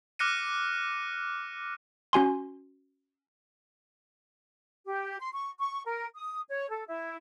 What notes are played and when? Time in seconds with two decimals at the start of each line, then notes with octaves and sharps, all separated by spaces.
0.19 D6 F6 F#6 A#6 C#7 D#7
2.13 C#4 F#4 G#5 C6
4.86 G4
5.20 C6
5.32 C#6
5.59 C#6
5.85 A#4
6.15 D#6
6.48 C#5
6.70 A4
6.87 E4